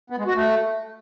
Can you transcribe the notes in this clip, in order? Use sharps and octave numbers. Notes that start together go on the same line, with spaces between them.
B3
G#3
F#4
A3